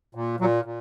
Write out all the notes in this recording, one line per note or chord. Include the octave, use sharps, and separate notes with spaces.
A#2
A#2 F#3
A#2